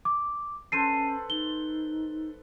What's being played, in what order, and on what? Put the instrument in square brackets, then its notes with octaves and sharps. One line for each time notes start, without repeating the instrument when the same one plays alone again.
[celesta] D6
[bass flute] C#4 [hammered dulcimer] A4 B4 C5 [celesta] C7 D#7
[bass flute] D#4 [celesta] G7